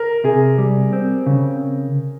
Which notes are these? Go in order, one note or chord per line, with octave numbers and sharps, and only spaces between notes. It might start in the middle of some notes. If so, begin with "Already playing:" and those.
Already playing: A#4
C3 G#4
G3
C4
C#3